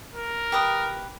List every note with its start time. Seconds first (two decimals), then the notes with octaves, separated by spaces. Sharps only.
0.15 A#4
0.52 G4 B4 D#6